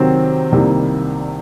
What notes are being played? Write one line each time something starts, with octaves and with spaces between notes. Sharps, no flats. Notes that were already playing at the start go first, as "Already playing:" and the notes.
Already playing: C3 D#3 F#3 C4
C2 C3 D#3 G3 A#3